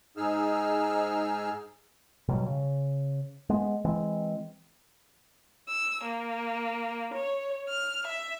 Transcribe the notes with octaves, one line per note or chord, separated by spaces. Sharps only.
G#2 D#4 G#4 E6 F6
B2 F#3 G3
C#3
G#3 B3
E3 G#3 C4
E6
A#3
C#5
F6
E5